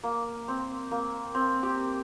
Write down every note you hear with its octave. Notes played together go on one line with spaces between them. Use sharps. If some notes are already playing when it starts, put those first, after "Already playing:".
A#3
C4
A#3
C4
G4